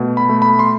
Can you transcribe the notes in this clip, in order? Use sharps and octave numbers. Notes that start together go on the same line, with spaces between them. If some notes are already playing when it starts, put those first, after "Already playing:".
Already playing: B2 A3
B5
A3
B5
C6